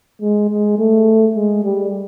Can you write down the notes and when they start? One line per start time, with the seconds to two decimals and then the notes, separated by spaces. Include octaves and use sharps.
0.22 G#3
0.50 G#3
0.79 A3
1.35 G#3
1.64 G3